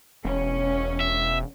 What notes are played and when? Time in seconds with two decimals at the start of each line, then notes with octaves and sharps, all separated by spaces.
0.25 E1 C#4
1.00 E5